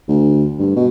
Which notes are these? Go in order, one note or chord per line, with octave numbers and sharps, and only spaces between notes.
D2
G2
B2